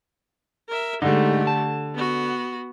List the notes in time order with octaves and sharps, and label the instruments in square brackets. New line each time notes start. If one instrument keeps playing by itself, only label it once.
[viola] A#4 E5
[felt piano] D3 [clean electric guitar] G#3 D#4 [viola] A3 G4
[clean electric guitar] A5
[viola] B3 F#4